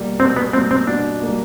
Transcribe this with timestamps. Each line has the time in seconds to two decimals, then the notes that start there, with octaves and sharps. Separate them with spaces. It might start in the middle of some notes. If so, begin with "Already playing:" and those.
Already playing: B2 G3 A#3
0.20 B2 C4
0.36 B3
0.53 G3 A#3 C4
0.71 C4
0.87 B2 D4
1.22 G3 A#3